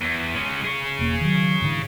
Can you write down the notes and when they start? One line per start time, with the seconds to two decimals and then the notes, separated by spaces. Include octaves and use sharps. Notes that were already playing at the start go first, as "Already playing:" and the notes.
0.01 E2
0.35 G#3 C#4
0.64 G#4 C#5
0.99 E1 A#3
1.21 D#3 F#3
1.62 G#2 D3 E3